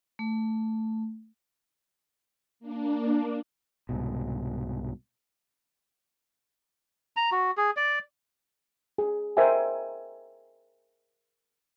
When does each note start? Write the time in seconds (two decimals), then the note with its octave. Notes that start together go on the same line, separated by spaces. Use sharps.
0.19 A3
2.60 A#3 D4
3.89 C2 G#2 B2
7.16 A#5
7.32 F#4
7.57 G#4
7.77 D5
8.98 G#4
9.37 A#4 C5 D#5 E5 G5 G#5